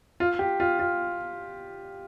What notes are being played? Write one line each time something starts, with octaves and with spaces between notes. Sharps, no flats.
F4
G4
F4
F4